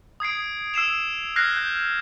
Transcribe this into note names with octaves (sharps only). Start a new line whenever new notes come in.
D#6 G#6 C7 D7
E6 C7 E7 F7
F6 F#6 G#6 A#6 C7
G6